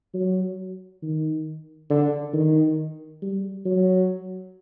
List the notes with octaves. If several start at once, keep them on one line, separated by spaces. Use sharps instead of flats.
F#3
D#3
D3
D#3
G3
F#3